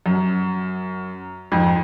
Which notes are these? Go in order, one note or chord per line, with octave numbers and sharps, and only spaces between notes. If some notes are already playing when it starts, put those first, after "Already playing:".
F#2
F2 G#2